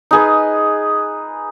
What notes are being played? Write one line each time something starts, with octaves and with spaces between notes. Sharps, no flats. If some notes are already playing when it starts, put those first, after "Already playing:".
D#4 G#4 B4